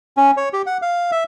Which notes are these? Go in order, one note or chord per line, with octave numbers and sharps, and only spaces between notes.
C#4
C#5
G4
F#5
F5
E5